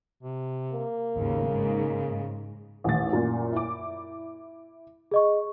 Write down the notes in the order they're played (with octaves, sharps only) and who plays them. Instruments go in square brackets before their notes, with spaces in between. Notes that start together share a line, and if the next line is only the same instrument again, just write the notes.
[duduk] C3
[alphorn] A#3
[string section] G#1 D#2 [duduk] C#3
[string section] G#2
[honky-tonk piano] A1 D#2 A6
F#2 A#2
E4 D6
[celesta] G#4 D#5 C#6